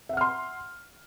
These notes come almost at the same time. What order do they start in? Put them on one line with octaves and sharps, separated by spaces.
E5 F#5 F6 C6